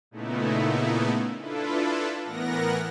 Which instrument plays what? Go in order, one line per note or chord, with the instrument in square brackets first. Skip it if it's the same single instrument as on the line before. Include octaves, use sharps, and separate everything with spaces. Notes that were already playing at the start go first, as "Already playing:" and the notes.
[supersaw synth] A#2 C#3 A3 B3 D#4 E4
D4 E4 F4 A4 B4
A2 E3 B3 A#4 F#5 A#6